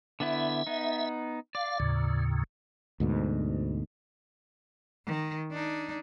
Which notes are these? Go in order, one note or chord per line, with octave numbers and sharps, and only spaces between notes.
D3 B3 E4 E5
B3 D#4
D5 F5
D#2 A2 C#3
D2 G#2 B2
D#3
D4 D#4